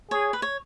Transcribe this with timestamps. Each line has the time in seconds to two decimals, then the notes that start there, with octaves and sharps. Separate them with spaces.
0.11 G#4 C#5
0.33 B4
0.42 C#5